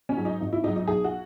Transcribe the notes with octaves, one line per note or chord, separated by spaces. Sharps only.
C#4
G#2 F#3
D#4
G#1
E4
G#2 F#3 D#4
D#4
B1 G#4
F#4